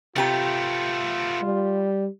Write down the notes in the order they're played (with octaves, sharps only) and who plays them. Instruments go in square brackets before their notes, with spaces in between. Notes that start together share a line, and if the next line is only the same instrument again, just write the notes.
[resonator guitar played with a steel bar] C3 G4 A#5 [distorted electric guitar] A3 B3 [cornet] F4
[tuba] G3